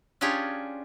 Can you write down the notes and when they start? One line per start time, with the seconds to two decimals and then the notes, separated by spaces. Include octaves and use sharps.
0.21 C#4 D4 F4 G4 G#4 C#5